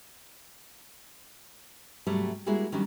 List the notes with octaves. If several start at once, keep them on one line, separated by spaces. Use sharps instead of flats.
G#2 C3 F#3 G3 A3
G3 G#3 A#3 E4 F#4 G#4
D#3 F#3 G3 C#4 D4